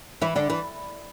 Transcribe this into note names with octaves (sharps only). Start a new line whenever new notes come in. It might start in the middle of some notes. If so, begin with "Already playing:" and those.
E3 E4
D3 D4
E3